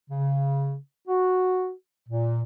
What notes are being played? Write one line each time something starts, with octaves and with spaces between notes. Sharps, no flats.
C#3
F#4
A#2